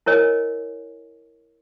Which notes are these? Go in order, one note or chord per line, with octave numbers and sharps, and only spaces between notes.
E4 A#4 C#5 D#5 G#5